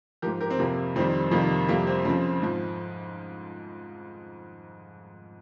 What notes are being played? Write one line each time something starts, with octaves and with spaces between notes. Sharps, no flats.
G#2 F3 G4 A#4
G4 A#4
C4
F2 C3 F3 A#3
F2 D#3 G3 C4
F2 C3 D#3 G3 A#3
F2 C3 G3 A#3
C4
F2 C#3 F3 C4
G#2 F3